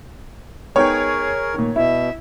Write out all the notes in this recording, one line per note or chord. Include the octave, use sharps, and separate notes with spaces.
B3 D#4 G#4 A#4 C#5 G5
A#2 D#3
B2 E4 E5